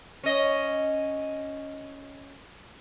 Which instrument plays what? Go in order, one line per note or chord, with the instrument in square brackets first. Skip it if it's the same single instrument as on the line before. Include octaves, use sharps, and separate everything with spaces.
[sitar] C#4 D#5